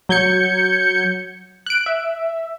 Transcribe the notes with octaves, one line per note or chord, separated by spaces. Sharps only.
F#3 G6 G#6 C#7
F#6 D7
E5